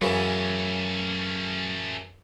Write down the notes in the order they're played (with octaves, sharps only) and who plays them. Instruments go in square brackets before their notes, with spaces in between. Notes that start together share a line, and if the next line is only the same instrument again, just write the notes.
[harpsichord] F#2 C#3 E3 [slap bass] F#3 [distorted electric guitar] A3 C#4